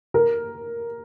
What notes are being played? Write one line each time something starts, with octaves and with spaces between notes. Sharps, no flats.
A#4